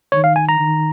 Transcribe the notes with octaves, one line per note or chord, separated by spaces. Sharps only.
D#3 C#5
F5
G#5
A#5
D#3